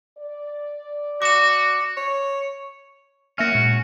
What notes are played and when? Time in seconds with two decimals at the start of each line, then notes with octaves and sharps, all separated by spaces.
0.18 D5
1.22 F#4 D6 E7
1.97 C#5
3.38 A#3 C#4 F#4 E5 F6
3.53 A#2 G#3